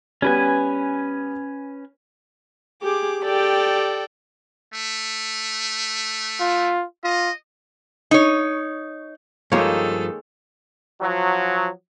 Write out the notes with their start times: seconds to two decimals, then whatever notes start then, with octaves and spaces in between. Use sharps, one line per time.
0.22 G3 B3 C#4 B4 G#5
2.82 G4 G#4 D6
3.23 G4 A4 D5 G5
4.74 A3
6.40 F4
7.04 F4 D#5
8.11 D#4 C#5
9.52 G2 D#3 F3 G#3 A#3 A4 C#5
11.00 F3 F#3